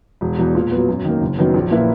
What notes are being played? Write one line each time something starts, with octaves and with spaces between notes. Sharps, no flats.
E1
E2 B2
A#2
F#3 B3
F#2
D#3 A#3
F#1
F#2 D#3 F#3 B3
A#1
A#2 A#3 E4 B4